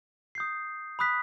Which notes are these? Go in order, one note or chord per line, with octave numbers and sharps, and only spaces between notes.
D#6 G6 C7
B5 D#6 F#6 B6